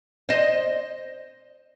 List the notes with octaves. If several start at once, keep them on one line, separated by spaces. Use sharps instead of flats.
C5 D#5